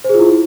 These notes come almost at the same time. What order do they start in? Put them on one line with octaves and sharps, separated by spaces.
C5 G#4 F4 E4